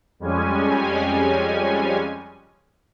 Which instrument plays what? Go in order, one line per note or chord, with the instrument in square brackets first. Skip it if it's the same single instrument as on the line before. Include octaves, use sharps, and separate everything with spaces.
[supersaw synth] F2 G3 G#3 C#4 G#5